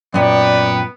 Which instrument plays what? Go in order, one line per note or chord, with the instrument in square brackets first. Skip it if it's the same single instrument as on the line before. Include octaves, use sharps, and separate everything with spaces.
[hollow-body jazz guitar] F#2 A#2 [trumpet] B3 [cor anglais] D5 [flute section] G5